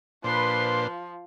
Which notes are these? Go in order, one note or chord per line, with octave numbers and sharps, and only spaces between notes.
A#2 F3 D4 B4 C5 C6